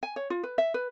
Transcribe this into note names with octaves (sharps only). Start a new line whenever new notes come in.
G#5
C#5
F4
B4
E5
B4